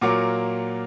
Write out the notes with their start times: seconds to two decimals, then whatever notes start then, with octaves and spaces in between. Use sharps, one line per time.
0.01 A#2 F#3 A#3 D6